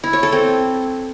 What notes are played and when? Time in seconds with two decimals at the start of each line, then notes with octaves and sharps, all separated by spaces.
0.04 E4
0.13 C#5
0.23 A4
0.33 C4